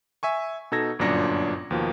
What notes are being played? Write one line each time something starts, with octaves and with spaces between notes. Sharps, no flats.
E5 G#5 C#6
B2 D#4 A4 E6 G#6 A#6
G1 F#2 A#2 D4 A#6 C#7
D#2 B2 F3 A#3